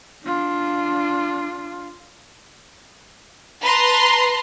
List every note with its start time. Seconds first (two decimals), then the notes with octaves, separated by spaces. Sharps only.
0.25 D4 F4
3.62 B4 A5 A#5 C6